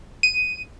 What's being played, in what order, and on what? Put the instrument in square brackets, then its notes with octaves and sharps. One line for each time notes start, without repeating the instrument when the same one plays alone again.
[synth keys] D#7